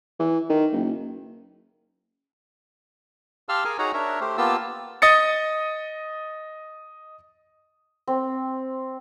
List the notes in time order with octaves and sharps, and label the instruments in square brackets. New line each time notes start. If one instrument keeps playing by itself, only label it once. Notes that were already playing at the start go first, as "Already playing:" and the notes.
[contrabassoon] E3
D#3
F#1
[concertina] G4 F5 A5 C6 E6 F6
G#4 A#4 G#5
D#4 F#4 G#4 C#5 F#5 A#5
D4 A#4 C#5 E5
A3 G4 C5
A#3 B3 F4 G4 A5 E6
[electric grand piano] D#5 D#6 A6 C#7
[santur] C4